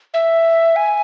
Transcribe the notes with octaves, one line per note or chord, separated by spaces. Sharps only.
E5
G#5